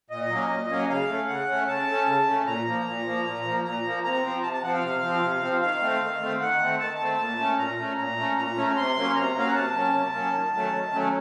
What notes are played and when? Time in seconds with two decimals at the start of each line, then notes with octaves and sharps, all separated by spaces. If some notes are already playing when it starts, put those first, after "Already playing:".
0.10 A#2 D#5
0.29 F#3 A#3 C#4
0.50 A#2
0.70 F#3 A#3 C#4
0.89 C#3 F5
1.09 A3 C#4
1.28 C#3 F#5
1.48 A3 C#4
1.68 C#3 A5
1.87 A3
1.92 C#4
2.07 C#3
2.27 A3 C#4
2.46 A#2 A#5
2.66 F3 A#3
2.86 A#2
3.06 F3 A#3
3.25 A#2
3.45 F3 A#3
3.65 A#2 A#5
3.84 F3 A#3
4.04 C3 A#5
4.24 F3 C4
4.43 C3 A5
4.53 A5
4.63 F3 C4 F#5
4.73 F5
4.83 C3
5.02 F3 C4
5.22 C3
5.41 F3 C4
5.61 D#3 F5
5.81 A3 C4
6.01 D#3
6.20 A3 C4
6.40 D#3 F#5
6.60 A3 C4
6.79 D#3 A5
7.00 A3 C4
7.18 A#2
7.38 A3 C#4
7.58 A#2 A#5
7.77 A3 C#4
7.98 A#2 A#5
8.17 A3 C#4
8.37 A#2 A#5
8.56 A3 C#4
8.66 A#5
8.76 C3 C6
8.96 F#3 A#3 C#4
9.15 C3 A#5
9.35 F#3 A#3 C#4 F5
9.47 F#5
9.54 C3 A5
9.74 F#3 A#3 C#4
9.94 C3
10.14 F#3 A#3 C#4
10.33 D#3
10.53 F#3 A3 C#4
10.73 D#3
10.93 F#3 A3 C#4